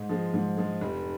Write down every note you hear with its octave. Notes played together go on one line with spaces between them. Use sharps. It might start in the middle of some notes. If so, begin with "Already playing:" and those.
Already playing: G#2
F3 G#3
G#2
F3 G#3
F1